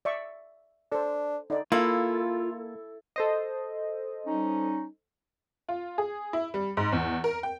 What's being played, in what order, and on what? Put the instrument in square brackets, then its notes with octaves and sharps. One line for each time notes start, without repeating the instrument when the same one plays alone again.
[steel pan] D5 E5 C#6
[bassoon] D4 [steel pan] A4 C5
[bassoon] D3 [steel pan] D#4 D5
[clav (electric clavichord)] A#3 [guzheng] E4 A4 [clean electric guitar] F4
[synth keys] A4 C5 D#5
[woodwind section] G3 C#4 D#4
[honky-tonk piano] F4
G#4
E4
G3
G#2
E2
A#4
G5